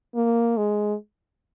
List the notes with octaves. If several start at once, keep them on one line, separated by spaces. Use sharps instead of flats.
A#3
G#3